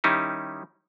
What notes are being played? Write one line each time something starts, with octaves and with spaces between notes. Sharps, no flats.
D#3 G3 C#4 D#4 E4